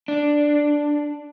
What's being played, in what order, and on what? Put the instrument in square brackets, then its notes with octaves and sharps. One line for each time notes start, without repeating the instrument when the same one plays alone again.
[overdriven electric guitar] D4